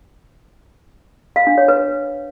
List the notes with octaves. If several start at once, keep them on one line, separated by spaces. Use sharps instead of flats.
F5
D4
C#5
B4